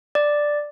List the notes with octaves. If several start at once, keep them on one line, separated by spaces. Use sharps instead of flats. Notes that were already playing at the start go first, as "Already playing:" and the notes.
D5